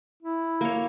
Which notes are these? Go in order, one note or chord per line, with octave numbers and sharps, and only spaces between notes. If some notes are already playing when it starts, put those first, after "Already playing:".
E4
A#3 C#5